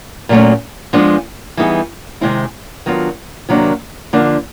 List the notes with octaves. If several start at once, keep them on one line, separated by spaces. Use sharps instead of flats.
A#2 F#3 A3 C#4
F3 G#3 B3 D4
E3 G3 B3 D#4 G#4
C3 D#3 G#3 C4 E4
D#3 F#3 B3 D4 F4
C3 D#3 F#3 A#3 D4
D3 F3 A#3 D4